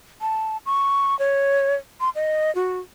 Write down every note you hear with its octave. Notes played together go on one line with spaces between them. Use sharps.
A5
C#6
C#5
C6
D#5
F#4